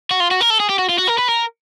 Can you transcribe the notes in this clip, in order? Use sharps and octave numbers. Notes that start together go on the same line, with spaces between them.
F#4
F4
F#4
A#4
A4
G#4
G4
F#4
F4
F#4
A#4
B4
A#4